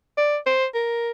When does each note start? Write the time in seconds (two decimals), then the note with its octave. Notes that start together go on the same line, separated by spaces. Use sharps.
0.18 D5
0.46 C5
0.74 A#4